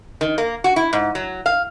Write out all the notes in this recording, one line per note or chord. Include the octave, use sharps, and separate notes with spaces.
D#3
A#3
F#4
E4
G#2
F#3
F5